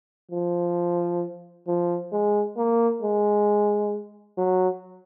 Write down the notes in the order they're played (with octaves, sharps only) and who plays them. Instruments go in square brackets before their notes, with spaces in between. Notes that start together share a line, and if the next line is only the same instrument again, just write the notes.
[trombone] F3
F3
G#3
A#3
G#3
F#3